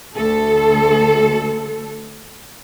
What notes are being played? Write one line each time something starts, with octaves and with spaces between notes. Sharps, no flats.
D2 A4